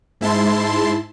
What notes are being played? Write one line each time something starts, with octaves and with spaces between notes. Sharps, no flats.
G#2 E4 A5 C6